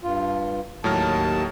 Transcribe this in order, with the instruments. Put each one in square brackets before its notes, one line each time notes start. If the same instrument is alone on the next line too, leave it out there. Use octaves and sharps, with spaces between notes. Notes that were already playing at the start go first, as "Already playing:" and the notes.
[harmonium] G2 F4
[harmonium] D#2 A5 [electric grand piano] A2 F#3 F6